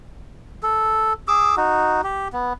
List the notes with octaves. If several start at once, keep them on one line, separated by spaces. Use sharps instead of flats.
A4
G#4 D6 E6
D#4 F#4
G4
B3